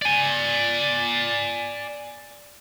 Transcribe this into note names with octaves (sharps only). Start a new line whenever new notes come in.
D5 G#5